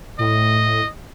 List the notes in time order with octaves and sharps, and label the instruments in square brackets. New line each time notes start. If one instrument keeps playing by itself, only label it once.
[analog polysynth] A2 [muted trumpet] D#5